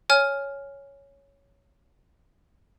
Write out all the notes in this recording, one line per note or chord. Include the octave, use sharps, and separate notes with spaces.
C#5 G#5 F6